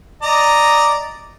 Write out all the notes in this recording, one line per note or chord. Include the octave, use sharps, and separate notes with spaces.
D5 D#5 A#5